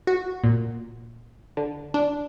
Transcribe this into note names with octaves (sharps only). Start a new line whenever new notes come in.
F#4
A#2
D3
D4